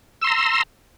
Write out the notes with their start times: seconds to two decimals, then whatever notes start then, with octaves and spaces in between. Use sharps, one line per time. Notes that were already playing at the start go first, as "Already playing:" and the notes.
0.21 E6
0.24 C6
0.27 A#5